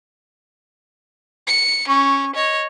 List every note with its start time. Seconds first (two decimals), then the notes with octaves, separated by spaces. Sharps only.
1.47 C#7
1.88 C#4 C#6
2.35 C#5 D#5